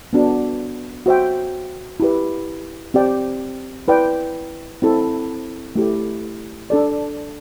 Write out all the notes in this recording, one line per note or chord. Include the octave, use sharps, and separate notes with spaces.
B3 D4 F#4
F#4 C5 E5 G5
E4 G4 B4
C4 G4 D5 G5
E4 B4 D5 G5
C4 E4 A4
A3 E4 G4
D4 A4 D5